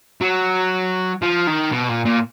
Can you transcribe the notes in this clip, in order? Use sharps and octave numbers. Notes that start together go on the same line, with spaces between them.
F#3
F3
D#3
B2
A#2
A#2